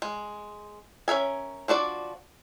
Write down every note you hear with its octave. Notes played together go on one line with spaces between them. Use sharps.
G#3
C#4 A#4 E5 G#5
F3 D4 F#4 D5